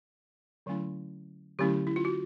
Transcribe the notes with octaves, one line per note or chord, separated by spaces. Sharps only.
D3 F#3 A3 C#4 E4
D3 F#3 A3 C#4 E4 G4
E4
F4
F#4